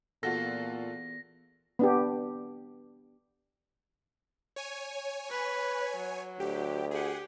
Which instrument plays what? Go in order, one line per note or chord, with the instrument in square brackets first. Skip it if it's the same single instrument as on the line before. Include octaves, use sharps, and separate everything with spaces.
[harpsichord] E2 [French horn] A#2 [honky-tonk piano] F4 F#4 A4 [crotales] A#6
[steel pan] B3 D4 G4
[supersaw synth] C#5 G#5
[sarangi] B4
F#3
[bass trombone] D2 [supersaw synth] G4
[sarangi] G4 [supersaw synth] G#4 F#5